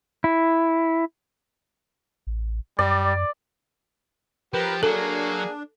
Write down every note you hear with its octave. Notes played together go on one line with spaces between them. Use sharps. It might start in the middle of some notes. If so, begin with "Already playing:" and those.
E4
A1
F#2 G3 D5
F3 G4 A#4 B4
F#3 A#3 D4 G#4 A4